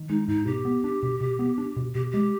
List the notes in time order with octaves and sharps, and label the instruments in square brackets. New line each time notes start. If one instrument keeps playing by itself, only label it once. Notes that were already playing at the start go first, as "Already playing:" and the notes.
Already playing: [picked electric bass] D#3
[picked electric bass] G#3 [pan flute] D#4
[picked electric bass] G#2 [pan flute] D#4
[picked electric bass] B2 [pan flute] G4
[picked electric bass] B3
D4
B2
B2
B3
D4
B2
[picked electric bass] B2 [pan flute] G4
[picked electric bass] G#3 [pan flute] G4